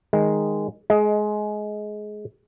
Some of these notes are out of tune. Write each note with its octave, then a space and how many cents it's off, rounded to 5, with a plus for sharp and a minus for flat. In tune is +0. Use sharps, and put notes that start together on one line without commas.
D#3 +0 G#3 -5
G#3 +20 D#5 +15